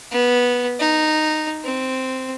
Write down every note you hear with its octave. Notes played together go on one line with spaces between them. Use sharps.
B3
D#4
C4